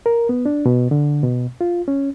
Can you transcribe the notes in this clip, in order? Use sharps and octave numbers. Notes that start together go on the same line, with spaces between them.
A#4
B3
D4
B2
D3
B2
F4
C#4